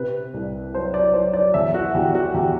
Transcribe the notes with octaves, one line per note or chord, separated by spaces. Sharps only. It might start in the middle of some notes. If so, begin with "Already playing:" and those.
Already playing: C3 B4
C2
F#3 C5
D5
F#3 C5
D5
E2 E5
F#4
E2 G4
F#4
E2 G4